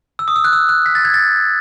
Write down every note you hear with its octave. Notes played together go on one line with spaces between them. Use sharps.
E6
D#6
E6
F#6
E6
F#6
B6
A6
G#6
A6